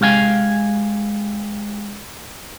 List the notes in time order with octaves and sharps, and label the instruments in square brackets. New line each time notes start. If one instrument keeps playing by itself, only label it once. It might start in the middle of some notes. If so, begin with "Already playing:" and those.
[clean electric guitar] G#3 G4 F5 G#5